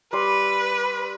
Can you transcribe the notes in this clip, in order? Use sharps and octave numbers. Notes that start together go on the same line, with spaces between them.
G3 B4 D5 C6